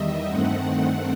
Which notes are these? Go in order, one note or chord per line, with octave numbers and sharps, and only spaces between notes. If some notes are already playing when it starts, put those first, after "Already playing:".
Already playing: E2 D#3 G3 D#5 E5
G2 D#3 A3 C4 F#5